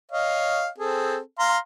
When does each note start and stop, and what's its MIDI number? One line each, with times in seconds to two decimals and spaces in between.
0.12 0.68 73
0.12 0.68 75
0.12 0.68 77
0.78 1.18 60
0.78 1.18 68
0.78 1.18 69
1.39 1.58 77
1.39 1.58 82
1.39 1.58 84